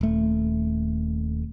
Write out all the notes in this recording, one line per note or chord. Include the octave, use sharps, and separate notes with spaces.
D#1 A3